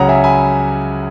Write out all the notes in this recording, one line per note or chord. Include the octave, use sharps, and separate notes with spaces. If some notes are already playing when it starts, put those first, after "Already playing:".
Already playing: C#2 C#3 F#3 F#5 A#5
E5 G#5
G#5 B5